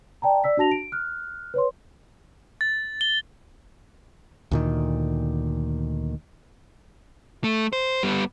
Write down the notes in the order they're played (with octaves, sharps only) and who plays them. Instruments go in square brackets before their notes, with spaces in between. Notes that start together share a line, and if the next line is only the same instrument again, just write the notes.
[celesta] D5 G5 A5 A#5
D5 E6 B6
D4 F#4 A5 A#6 F7
D7
F6 F#6
B4 C#5 C6
[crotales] A6
G7
[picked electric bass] D2 A#2 D#3
[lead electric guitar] A3
C5
G3 B3